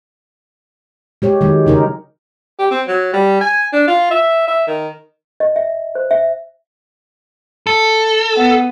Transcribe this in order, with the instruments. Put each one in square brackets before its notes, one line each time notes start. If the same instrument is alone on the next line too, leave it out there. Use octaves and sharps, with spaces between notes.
[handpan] G#3 G4 C#5
D#3 F#3 G#3
C#3 D#4 A#4
[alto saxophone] G4
C4
F#3
G3
G#5
D4
F4
E5
E5
D#3
[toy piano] D#5
E5
C5
E5
[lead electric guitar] A4
[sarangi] B3